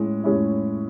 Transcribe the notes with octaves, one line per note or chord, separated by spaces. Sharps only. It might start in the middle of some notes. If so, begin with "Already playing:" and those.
Already playing: A2 G#3 C#4 E4
A2 G#3 C#4 E4